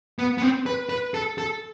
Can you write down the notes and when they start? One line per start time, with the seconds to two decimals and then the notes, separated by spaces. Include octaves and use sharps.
0.19 B3
0.38 B3
0.42 C4
0.66 B4
0.89 B4
1.14 A4
1.38 A4